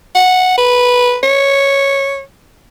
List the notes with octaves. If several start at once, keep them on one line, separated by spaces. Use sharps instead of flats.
F#5
B4
C#5